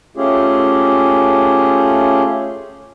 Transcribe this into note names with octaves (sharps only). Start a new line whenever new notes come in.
A3 C#4 F4 G4 G#4